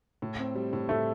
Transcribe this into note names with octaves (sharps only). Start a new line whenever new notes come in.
A2
C4
G3
A2
A2 A3